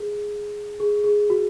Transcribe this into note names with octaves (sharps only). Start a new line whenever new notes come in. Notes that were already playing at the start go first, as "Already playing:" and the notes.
Already playing: G#4
G#4
G#4
F#4